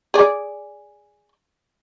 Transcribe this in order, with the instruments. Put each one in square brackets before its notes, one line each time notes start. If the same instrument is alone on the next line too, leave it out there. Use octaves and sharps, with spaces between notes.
[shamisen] G#4 D5